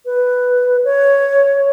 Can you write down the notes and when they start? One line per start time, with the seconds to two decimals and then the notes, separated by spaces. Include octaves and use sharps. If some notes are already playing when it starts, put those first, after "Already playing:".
0.06 B4
0.84 C#5